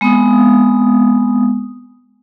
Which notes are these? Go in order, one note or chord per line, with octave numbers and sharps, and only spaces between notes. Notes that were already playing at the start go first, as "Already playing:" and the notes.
G#3 B3 C4 D#6